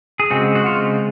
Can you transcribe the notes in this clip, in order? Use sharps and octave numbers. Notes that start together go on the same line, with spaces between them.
G#4
C#3 G#3 C4 F#4
F#4
F4